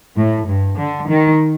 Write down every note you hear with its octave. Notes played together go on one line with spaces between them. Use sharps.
A2
G2
D3
D#3